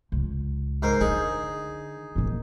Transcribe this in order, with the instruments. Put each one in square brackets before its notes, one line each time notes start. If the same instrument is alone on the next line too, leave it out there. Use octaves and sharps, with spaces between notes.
[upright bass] C#2
[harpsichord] G#2 A#4 C5
[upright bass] D3 [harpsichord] D#4 G#4
[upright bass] A#2 C#3